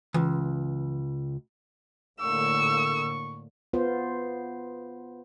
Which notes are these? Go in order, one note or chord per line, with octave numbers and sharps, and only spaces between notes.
C#2 E3
A2 D3 A#3 C#6 E6
B3 F4 C5